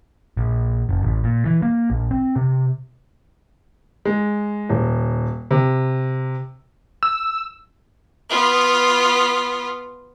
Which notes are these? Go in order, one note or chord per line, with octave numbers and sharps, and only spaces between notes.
A#1
F#1
A1
A#2
E3
A#3
A#1
C4
C3
G#3
D#1
C3
E6
B3 F4